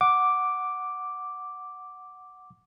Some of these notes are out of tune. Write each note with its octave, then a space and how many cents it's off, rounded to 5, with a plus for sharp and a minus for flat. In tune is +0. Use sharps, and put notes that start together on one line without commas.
F#5 +0 D6 +0